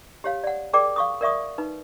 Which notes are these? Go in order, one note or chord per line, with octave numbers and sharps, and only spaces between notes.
G4 C#5 F5
D5 F#5
G#4 A#4 D5 G5 D6
F5 C#6 D#6
A#4 D5 E5 C#6 D#6
D#4 B4